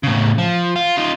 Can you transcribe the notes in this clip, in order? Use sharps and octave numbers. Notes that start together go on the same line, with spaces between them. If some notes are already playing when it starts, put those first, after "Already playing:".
A2 C#3
F3
F4
D#4 F4